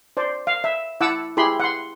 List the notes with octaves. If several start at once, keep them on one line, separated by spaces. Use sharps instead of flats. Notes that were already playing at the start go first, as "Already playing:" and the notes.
C5 D5
F5
E5
E4 F#5 A5 D6 E6
E4 G4 G#4 B5 C6
F#5 C6